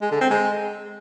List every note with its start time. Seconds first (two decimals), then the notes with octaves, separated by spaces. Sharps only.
0.02 G#3
0.11 D3
0.21 C4
0.30 G#3